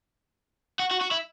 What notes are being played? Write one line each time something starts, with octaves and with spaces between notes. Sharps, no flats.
F#4
F#4
F#4
E4